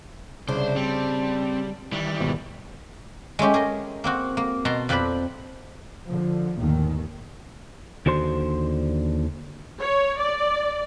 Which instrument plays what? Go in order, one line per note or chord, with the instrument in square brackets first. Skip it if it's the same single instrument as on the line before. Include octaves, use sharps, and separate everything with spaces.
[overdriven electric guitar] C2 [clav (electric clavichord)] C#3 [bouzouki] D4 [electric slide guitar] C5
[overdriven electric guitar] G3 [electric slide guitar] C4
[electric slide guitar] D#3 E3 [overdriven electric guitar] G3
[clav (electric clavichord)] G#1 B2
[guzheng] G#3 A3 C#4 G4
G#4 A#4 D#5
A#3 C4 F#4
A#3
B2 A5 A#5 C6
F2 F3 C4 B4 D5 B5
[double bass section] D3 F3
G1 D#2 A2 D#3
[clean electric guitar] D#2 D3 F#4 C5 C6
[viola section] C#5
D5